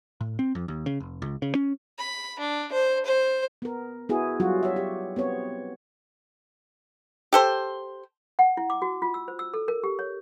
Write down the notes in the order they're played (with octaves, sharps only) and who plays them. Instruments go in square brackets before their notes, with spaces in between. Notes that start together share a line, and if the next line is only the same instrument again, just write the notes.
[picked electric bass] A2
C4
F2
D#2
C#3
F1
C#2
C#3
C#4
[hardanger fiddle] B5
D4
C5
C5
[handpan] B3 A#4
B3 E4 F#4 G#4
F#3 G3 F4 F#4
C#5 E5
G4
B3 C4 C#5
[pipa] G4 A4 C5
[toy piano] F#5
E4
D6
F#4
F4
E6
C5
E6
A4
A#4
G4
C#5